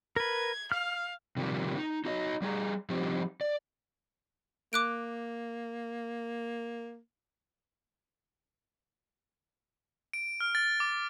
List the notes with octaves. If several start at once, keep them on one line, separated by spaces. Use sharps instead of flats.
A#4 B4 G#6
F5 F6
C3 D#3 F3 G3 A#3
D#4
D#4 F#4 D#5
G3 G#4 G#5 A#5
F3 G3 C4 D#4 G4
D5
A#3 D6 F#6 D7
D7
F6
A6
D6